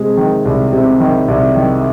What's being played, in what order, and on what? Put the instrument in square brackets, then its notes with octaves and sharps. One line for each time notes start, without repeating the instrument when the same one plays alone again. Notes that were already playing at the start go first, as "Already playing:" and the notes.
Already playing: [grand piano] C3 G#3
D#3
C2
C3
D#3
C2
D#3